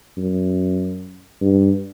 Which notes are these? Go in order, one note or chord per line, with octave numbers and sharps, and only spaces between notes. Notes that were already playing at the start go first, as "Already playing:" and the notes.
F#2
G2